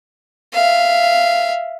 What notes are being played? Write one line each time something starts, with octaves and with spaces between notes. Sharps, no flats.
E5 F5